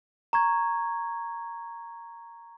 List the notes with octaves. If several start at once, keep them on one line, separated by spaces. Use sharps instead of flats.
A#5 C#6 G#6